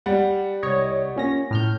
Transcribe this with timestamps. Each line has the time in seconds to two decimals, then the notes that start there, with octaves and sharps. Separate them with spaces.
0.06 G3 F#5
0.63 C2 C#5 D#5
1.16 A#2 C#4 A#6
1.51 A2 F6 G6